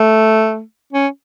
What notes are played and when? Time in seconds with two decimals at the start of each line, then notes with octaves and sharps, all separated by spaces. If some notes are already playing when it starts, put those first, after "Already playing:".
Already playing: A3
0.93 C#4